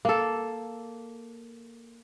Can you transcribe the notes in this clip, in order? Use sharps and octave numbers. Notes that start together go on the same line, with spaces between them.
A#3 A4